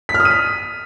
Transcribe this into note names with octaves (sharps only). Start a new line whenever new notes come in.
B6
F6
D#6
D#7
B6